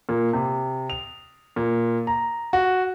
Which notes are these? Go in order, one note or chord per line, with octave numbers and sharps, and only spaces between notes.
A#2
C3
F7
A#2
A#5
F#4